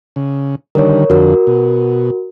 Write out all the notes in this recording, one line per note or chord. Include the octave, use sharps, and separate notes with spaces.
C#3
D3 D#3 G3 A#4 C#5
F2 D3 F#4 A#4
B2